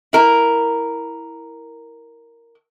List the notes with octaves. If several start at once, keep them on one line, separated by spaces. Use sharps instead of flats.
E4 A#4